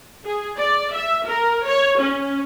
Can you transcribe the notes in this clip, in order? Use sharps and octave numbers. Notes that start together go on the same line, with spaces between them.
G#4
D5
E5
A#4
C#5
C#4